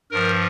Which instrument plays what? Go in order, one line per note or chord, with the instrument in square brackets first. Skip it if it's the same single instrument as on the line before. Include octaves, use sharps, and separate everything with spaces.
[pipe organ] G2 F3 A#4